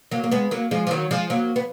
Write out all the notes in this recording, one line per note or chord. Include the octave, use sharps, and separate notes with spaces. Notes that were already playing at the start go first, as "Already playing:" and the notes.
F#3 A#3
A#3
G#3 B3
F#3 A#3
F3 G#3
F3
D#3 F#3
F3 G#3
F#3 A#3
B3